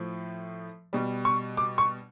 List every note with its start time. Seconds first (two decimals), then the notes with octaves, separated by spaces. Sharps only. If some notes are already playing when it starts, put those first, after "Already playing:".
Already playing: A2 F3
0.93 B2 G3
1.25 C#6
1.57 D6
1.78 C#6